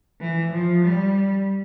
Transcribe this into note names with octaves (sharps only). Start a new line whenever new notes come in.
E3
F3
G3